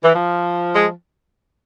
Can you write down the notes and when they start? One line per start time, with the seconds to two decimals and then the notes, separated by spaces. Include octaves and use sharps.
0.04 E3
0.14 F3
0.75 G#3